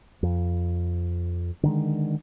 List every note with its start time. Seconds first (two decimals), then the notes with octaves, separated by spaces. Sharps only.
0.23 F2
1.63 D3 D#3 G#3